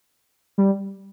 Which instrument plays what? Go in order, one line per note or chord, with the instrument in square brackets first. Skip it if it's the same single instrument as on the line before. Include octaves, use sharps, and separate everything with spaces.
[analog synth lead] G3